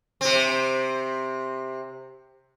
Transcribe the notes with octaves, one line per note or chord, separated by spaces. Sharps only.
C3 C4